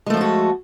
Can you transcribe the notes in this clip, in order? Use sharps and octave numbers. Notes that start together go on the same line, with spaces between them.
F3 G#3 A3 F#4 A4